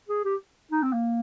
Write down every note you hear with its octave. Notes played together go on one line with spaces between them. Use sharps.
G#4
G4
D#4
C4
A#3